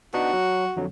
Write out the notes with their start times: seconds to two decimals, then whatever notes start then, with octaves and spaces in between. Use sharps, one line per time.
0.14 B3 D4 D#4 F#4
0.33 F#3
0.76 F2 D3 F#3